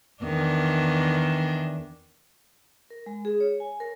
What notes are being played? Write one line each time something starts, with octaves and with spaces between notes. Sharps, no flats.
E2 D#3 D4
A#4
G#3
G#4
C#5
G#5
A#4